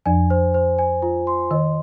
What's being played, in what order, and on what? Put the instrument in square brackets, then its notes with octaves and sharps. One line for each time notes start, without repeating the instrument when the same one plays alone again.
[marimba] F2 F3 [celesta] G#5
[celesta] C5
C5
G#5
F4
C6
[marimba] D#3 [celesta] D#5